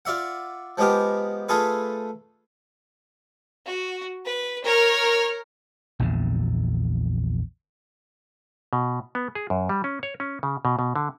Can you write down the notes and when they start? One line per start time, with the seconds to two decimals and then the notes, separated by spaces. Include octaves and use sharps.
0.05 F4 D5 E5 F#5
0.78 F3 G#3 B3 G4 A#4
1.49 A3 F4 G#4 A4 B4
3.66 F#4
4.26 B4
4.64 A#4 C#5 F6
6.00 A#1 E2 A#2 D3
8.73 B2
9.15 B3
9.35 G#4
9.50 F#2
9.69 G3
9.84 C#4
10.03 C#5
10.20 C#4
10.43 C#3
10.65 B2
10.79 B2
10.96 D3